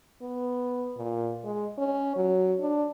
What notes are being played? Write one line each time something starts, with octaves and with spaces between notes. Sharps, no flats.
B3
A#2
G#3
C#4
F#3
D4